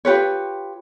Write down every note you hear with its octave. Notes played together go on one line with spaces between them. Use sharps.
F4 G4 B4 C#5